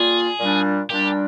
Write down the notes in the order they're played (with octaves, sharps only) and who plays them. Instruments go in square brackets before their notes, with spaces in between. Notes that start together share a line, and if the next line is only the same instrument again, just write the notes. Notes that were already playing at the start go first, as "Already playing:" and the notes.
Already playing: [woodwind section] A#2 G3 A#3 F4 [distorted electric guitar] G#4
[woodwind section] A#2 G3 D4
[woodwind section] A#2 G3 D4 [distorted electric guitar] G4